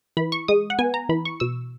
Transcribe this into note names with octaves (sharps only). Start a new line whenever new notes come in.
E3 B5
C#6
G#3 D#6
F#5
B3 G#5
A#5
E3 B5
C#6
B2 E6